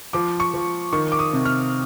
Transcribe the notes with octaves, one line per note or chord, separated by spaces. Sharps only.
F3 D6
C#6
F3
D#3 C#6
D6
D#6
C3
F6